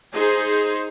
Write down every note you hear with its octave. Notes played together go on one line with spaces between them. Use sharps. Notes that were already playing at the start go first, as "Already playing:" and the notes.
D#4 G#4 C5